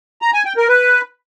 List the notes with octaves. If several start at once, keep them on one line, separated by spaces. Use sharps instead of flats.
A#5
G#5
G5
A#4
B4